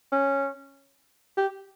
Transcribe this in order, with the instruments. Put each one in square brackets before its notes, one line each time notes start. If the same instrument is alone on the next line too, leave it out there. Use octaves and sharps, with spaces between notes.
[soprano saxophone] C#4
G4